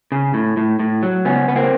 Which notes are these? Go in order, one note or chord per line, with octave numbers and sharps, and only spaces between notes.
C#3
A2
A2
A2
F#3
C#2 B3 C#4
C#2 B3
A#3 C4